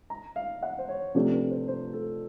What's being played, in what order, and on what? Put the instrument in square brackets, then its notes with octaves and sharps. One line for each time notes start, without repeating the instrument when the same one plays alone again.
[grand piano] A#5
F5
F#5
C5
C#5
[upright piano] C3 F3 A3 D4 G4 [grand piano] C5
[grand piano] B4
C5
C5
A4